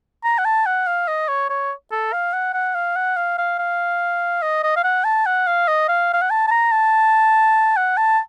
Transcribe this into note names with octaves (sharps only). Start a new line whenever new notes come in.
A#5
F#5
A5
F#5
F5
D#5
C#5
C#5
A4
F5
F#5
F#5
F5
F#5
F5
F5
F5
D#5
D#5
F5
F#5
A5
F#5
F5
D#5
F5
F5
F#5
A5
A5
A#5
A5
F#5
A5